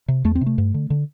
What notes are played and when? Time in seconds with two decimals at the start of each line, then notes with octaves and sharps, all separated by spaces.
0.08 C3
0.24 E2 A3
0.35 C4
0.41 C3
0.46 A3
0.58 G2
0.74 D3
0.90 D3